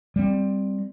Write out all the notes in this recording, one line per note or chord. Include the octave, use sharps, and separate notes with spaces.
G3 C4